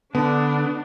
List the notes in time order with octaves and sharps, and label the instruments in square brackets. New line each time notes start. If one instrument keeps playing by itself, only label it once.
[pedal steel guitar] D3 [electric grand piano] B3 [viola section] D4